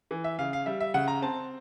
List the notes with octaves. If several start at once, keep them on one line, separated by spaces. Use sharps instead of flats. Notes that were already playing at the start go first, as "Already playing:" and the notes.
E3
E5
C#3 F5
F5
G3 E5
E5
C#3 F#5
A#5
C4 A5